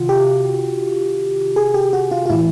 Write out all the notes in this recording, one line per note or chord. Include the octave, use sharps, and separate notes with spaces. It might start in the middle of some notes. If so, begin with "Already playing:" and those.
Already playing: C3 D#3 F4 F#4
G4
G#4
G4
F#4
F4
F4
A2 E3 E4